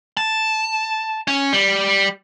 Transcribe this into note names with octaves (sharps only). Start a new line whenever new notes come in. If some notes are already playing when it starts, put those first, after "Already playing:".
A5
C#4
G3